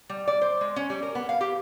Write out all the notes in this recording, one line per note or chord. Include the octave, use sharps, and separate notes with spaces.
G3
D5
C5
G#3
C#4
G3
A#4
B3
F5
G4